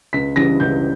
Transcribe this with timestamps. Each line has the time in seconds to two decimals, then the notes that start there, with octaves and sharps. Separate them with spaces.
0.13 C#2 B6
0.36 C#3 E3 G3 A#6
0.60 C#2 G6